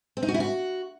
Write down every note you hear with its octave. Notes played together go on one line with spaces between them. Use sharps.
C4
D#4
F#4
E4
F#4